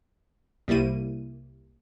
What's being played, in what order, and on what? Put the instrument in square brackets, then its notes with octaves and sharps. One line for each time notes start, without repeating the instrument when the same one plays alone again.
[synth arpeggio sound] C2 G3 A#3 E4 D#7